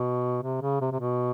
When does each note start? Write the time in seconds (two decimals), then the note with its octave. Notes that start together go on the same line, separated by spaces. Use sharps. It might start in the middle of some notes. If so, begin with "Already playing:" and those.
Already playing: B2
0.43 C3
0.61 C#3
0.81 C3
0.92 C3
1.00 B2